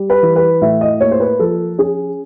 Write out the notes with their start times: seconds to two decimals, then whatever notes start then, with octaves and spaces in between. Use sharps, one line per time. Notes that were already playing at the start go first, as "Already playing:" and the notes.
Already playing: G3
0.10 B4
0.23 E3
0.36 B4
0.62 A2 E5
0.81 D#5
1.00 A#3 C#5
1.11 C5
1.20 B4
1.39 F3 A4
1.78 C#4 G#4